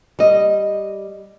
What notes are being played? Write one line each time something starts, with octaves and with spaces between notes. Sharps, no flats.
G3 D#5